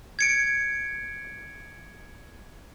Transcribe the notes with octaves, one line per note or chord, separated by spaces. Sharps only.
G#6 C#7 D7